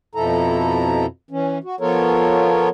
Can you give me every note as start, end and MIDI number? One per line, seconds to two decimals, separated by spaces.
0.15 1.06 41
0.15 1.06 47
0.15 1.06 53
0.15 1.06 64
0.15 1.06 69
0.15 1.06 82
1.31 1.58 52
1.31 1.58 61
1.64 1.76 66
1.80 2.69 53
1.80 2.69 59
1.80 2.69 65
1.80 2.69 69
1.80 2.69 70
1.80 2.69 73